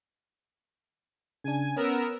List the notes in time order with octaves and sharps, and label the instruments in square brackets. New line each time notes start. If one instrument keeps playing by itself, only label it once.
[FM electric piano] C#3 D4 [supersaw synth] G#5
[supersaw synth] B3 A#4 E6 [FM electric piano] C#4